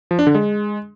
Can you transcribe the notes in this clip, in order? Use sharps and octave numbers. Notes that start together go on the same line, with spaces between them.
F3
D4
D3
G#3